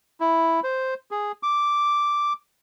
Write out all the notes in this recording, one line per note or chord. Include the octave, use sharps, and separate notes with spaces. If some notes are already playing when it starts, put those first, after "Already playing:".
E4
C5
G#4
D6